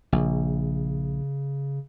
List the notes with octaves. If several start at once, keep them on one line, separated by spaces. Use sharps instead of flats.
A#1 C#3